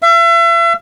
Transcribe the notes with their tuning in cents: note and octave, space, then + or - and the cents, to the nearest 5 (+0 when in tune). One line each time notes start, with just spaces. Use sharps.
E5 +40